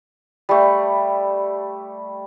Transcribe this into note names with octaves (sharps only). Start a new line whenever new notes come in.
G3 A3